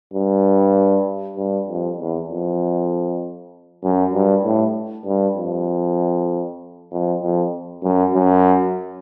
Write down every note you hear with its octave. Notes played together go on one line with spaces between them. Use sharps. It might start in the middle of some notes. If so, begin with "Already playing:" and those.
G2
G2
F2
E2
F2
F#2
G2
A2
G2
F2
F2
F2
F#2
F#2